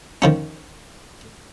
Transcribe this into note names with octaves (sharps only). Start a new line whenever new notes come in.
D#3 F3 C#4